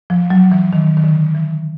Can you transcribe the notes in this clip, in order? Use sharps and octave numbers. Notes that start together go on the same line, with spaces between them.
F3
F#3
E3
D#3
D#3
D3
E3